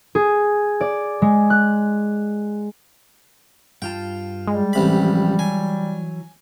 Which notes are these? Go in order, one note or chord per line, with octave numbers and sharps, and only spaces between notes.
G#4
D5
G#3
F#6
G2 F4 G5 A5
G3 G#3
A1 C3 B5
F3
E3 F#3 G#5